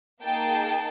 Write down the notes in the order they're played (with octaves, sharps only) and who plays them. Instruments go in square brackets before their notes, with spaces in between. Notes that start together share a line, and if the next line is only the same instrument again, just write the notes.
[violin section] A#3 D#4 G#4 G5 A5